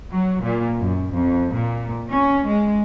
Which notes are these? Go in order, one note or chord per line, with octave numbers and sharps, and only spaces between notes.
F#3
A#2
F#2
F2
A#2
C#4
G#3